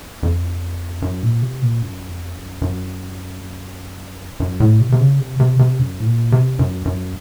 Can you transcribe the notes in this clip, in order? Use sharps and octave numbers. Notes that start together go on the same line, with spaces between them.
F2
F#2
A#2
C3
A#2
F#2
F2
F#2
F#2
F#2
A2
C3
C3
C#3
C3
C3
C3
F#2
A2
A#2
C3
F#2
F#2